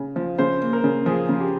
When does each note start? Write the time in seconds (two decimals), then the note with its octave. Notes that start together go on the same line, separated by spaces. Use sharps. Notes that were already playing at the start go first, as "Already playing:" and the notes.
Already playing: C#3
0.16 F3
0.38 C#3 C5
0.62 A#3
0.73 A#4
0.84 C#3
1.06 F3 G#4
1.29 C#3
1.40 G4